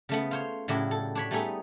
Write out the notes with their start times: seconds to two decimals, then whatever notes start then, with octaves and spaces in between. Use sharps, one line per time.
0.09 C#3 A3 B3
0.31 F4 C5 C#5
0.68 A2 C#3 F#3 D4 E4 G4
0.91 A4
1.15 D4 C#5 B5
1.31 G3 A3 B3 D#4 G#4 A4